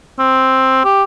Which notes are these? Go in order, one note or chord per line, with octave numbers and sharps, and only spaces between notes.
C4
G4